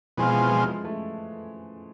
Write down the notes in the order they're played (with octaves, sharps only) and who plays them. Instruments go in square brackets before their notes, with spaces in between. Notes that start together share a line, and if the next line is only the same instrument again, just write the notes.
[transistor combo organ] B2 G#3 C4 F4 [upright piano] F3
[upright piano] E3
F3
G#3
A3